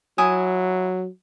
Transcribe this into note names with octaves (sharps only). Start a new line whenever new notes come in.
F#3 E4 G#5 D#6